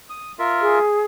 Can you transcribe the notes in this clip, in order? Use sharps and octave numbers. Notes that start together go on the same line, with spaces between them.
D#6
F4 A#4 E5
G#4